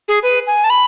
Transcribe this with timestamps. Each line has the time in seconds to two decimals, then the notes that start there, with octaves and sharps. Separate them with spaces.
0.08 G#4
0.23 B4
0.47 G#5
0.64 A5
0.70 B5